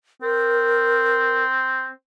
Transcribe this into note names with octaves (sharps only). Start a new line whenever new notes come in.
C4 A#4